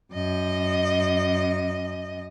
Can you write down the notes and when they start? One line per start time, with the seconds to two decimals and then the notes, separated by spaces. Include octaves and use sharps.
0.13 F#2 D#5